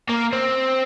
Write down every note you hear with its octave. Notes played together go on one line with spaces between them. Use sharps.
A#3
C4